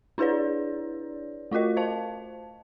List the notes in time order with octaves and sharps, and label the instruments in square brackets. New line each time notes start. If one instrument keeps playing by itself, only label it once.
[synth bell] D4 E4 G#4 B4 C#5 D5
A3 F4 F#4 A#4 D#5
C5 F5 A5